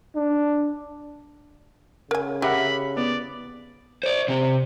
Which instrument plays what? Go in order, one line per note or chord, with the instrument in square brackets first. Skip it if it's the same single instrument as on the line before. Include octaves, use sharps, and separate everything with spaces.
[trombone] D4
[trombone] C#3 [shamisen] A#4 G#5
[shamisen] G4 [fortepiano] A#4 E5 F#5 [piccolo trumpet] B5
[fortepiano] B3 [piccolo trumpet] D5
[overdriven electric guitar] C5 D5
C3 C4